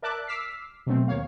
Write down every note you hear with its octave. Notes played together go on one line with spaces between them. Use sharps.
A#4 D5 E5 A5 D6 F#6
D6 E6 F6 B6 C7
B2 F#3 A3 C4
D#2 A#3 C#5 F5